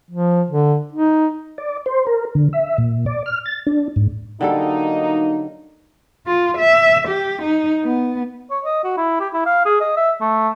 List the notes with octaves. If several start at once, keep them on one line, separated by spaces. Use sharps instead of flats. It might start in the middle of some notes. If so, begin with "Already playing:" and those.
F3
D3
D#4
D5
C5
A#4
D3
E5
A#2
D5
F6
A6
D4
G#2
D3 F#3 G3 A#3 D#4 A4
F4
E5
G4
D#4
B3
C#5
D#5
F#4
E4
G4
E4
F5
G#4
D#5
E5
A3